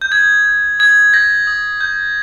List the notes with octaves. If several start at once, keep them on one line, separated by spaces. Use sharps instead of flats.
G6
D#6 G#6
G6
D#6 G#6
G6 A#6
D#6
G6